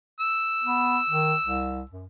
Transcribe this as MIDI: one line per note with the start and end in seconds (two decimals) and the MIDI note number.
0.20 1.89 88
0.64 0.99 59
1.10 1.34 51
1.41 1.83 36
1.91 2.06 42